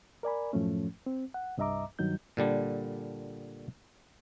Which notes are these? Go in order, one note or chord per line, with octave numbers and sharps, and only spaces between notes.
A#4 D5 G#5 B5
F#2 A2 F3 A3 C#4
C4
F#5
C2 G2 D#5 E5 A#5 D6
G2 D#3 F#3 D#4 G6
A#2 D3 G3 D4